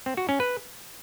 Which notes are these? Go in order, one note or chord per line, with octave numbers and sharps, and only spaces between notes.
C4
F#4
C#4
B4